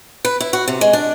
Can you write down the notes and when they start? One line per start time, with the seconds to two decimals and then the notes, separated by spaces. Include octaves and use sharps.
0.25 B4
0.40 E4
0.53 F#4
0.68 C3
0.81 G#3
0.93 D4